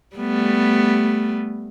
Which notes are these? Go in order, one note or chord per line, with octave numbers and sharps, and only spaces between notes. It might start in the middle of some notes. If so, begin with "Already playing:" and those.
G3 A3 B3